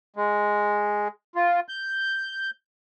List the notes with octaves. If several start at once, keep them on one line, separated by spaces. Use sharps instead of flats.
G#3
F4
G6